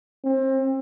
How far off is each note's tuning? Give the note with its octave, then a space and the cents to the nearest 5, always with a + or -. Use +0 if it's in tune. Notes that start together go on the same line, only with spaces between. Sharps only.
C4 +30